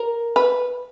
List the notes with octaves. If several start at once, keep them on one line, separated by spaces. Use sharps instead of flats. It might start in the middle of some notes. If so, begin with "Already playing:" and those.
Already playing: A#4
B4